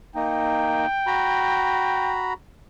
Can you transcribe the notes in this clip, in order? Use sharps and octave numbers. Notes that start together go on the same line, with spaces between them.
A#3 D#4 G5
F#4 A#5 B5